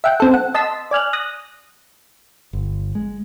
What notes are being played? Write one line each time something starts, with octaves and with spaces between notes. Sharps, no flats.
E5 F#5 G5
C4 A4
F#5
D#5 A5 C6 E6 B6
D5 G#5 F6 F#6
D#6 F#6 A#6
G1
G#3